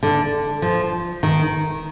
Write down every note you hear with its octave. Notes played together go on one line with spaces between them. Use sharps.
D3
F3
D#3